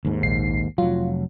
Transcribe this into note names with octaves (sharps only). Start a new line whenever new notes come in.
D#2 G#2
A#1 C7
F1 F#3 F4